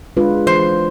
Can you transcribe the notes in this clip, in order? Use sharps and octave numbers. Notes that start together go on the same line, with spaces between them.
G#3 D4 F4 B4
E3 C5